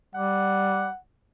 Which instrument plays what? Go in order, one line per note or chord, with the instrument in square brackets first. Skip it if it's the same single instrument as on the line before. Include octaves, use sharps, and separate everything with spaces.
[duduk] G3 [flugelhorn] F#5